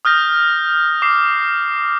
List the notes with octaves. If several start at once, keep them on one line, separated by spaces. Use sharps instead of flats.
D#6 F6 G6 A#6
D6 C7